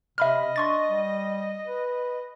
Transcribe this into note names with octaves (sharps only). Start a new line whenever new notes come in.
C3 D#5 E5 B5 F6
D4 C6 C#6 A6
G3
B4